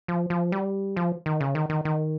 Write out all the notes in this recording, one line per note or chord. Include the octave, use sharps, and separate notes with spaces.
F3
F3
G3
F3
D#3
C#3
D#3
D#3
D#3